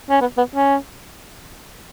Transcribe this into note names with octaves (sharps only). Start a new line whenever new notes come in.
C#4
B3
B3
C#4